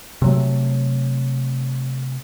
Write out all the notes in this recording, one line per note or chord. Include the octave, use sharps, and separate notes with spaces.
C3 F#3 A3